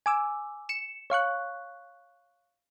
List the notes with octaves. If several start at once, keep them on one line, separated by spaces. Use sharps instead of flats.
G#5 D6 E6
C#7 E7
C#5 F5 C#6 F#6